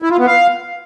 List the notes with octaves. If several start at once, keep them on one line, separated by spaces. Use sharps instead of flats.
E4
F4
B3
F5